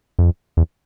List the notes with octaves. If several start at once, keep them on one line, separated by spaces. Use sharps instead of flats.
F2
E2